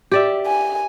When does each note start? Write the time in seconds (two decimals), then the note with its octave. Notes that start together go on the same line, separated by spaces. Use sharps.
0.11 G4 D5 E5
0.47 G#5